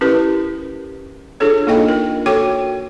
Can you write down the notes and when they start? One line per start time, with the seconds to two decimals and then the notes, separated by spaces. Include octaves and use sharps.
0.01 C#4 E4 G4 A#4 B4
1.40 D4 F4 G#4 A4 C#5
1.67 A#3 D#4 F4 A4 D#5 G5
1.89 A#4
2.26 F#4 A4 C#5 G5 D6